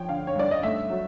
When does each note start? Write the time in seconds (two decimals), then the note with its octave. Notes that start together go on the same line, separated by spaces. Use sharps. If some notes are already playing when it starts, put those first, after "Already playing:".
Already playing: F3 C#5 G5
0.09 D3 F5
0.27 C#5
0.36 G2 D5
0.51 D#5
0.63 A3 E5
0.90 F#3